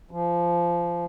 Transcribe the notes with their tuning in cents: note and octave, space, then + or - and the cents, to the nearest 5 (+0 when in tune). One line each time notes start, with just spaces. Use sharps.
F3 -20